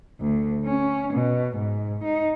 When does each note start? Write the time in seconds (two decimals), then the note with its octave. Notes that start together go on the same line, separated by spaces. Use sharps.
0.20 D2
0.65 C#4
1.13 B2
1.57 G#2
2.04 D#4